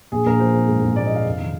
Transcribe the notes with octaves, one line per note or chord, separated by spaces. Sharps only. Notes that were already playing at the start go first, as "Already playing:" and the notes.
A#1 G#4
A#1 A#4
F3 C5
C4
G#2
G#2
A#1 D5
D#5
F3 F5
F1
D#3